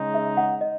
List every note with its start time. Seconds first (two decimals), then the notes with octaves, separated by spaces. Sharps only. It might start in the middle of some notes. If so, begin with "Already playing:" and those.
Already playing: C#3 G#3 D#4
0.14 E5
0.37 F#5
0.61 D#5